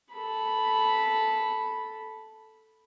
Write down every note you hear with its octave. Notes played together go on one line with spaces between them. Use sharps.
A4 B5